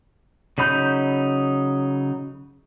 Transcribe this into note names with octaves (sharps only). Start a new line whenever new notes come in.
C#3 F#3 D#4 B5 G6